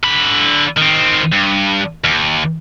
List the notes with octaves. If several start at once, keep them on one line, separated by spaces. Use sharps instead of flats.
D3 B5
D#3 C4
G2
D#2